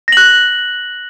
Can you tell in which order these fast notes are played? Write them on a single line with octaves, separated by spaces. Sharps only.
A#6 F#7 F#6